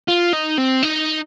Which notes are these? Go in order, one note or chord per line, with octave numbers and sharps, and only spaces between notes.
F4
D#4
C4
D#4